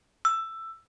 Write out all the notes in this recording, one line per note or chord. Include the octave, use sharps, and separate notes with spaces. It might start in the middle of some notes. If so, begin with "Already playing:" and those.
E6